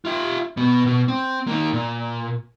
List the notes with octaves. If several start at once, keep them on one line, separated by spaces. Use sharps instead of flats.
F4 E5
B2 B3
B2
C4
A#3 D#4
A#2